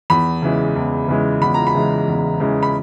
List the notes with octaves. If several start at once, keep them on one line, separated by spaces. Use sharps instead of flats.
E2 B5
C#3 E3 G#3
E2
C#3 E3 G#3
E2 B5
A#5
B5
C#3 E3 G#3
E2
C#3 E3 G#3
B5